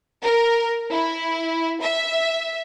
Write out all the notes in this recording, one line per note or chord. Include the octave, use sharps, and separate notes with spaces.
A#4
E4
E5